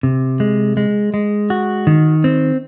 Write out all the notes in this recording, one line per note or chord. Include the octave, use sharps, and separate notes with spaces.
C3
G#3
G#3
G#3
F#4
D#3
C4